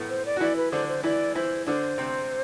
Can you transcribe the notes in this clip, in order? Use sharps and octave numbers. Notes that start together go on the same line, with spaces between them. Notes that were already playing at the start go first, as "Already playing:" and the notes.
Already playing: A2 A3 B3
C5
D5
F#4
E3 E4 D5
B4
D3 D4 C5
C5
E3 E4 D5
E3 E4 C5
D3 D4 C5
C3 C4